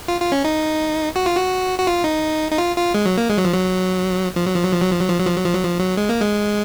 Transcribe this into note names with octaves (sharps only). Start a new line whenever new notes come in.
F4
F4
C#4
D#4
F#4
F4
F#4
F#4
F4
D#4
D#4
F4
F4
G#3
F#3
A#3
G#3
F#3
F3
F#3
F3
F#3
F3
F#3
F3
F#3
F3
F#3
F3
F#3
F3
F#3
F3
F#3
F3
F#3
G#3
A#3
G#3